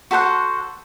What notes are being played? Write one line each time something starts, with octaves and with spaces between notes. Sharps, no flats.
F#4 A4 C5 F#5